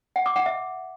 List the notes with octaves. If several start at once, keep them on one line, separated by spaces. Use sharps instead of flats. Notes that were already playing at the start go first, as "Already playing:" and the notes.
F#5
D6
F#5
E5